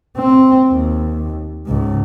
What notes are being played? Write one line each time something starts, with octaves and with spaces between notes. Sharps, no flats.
C4
D#2
C#2 G#2